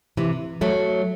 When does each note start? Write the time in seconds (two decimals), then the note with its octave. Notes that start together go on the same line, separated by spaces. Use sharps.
0.17 C3 E3
0.61 F#3 A3